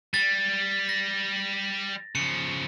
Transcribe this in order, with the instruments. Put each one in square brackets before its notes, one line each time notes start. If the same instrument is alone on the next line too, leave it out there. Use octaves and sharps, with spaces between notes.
[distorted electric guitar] G3 [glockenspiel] A6
[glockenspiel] A#6
[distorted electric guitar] C#3 F3 [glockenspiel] C#7